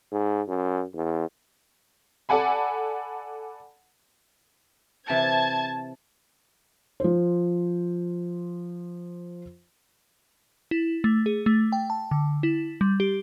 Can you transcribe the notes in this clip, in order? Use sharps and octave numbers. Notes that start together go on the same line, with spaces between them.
G#2
F#2
E2
A4 D5 F#5 G#5 B5
C3 E3 A5 G#6
F3 C5
E4
A3
G#4
A3
G5
A5
D3
E4
G3
G4